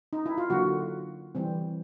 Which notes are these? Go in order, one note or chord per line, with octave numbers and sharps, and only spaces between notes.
D#4
E4
F4
D3 F#3 A#3 F#4
E3 G3 C4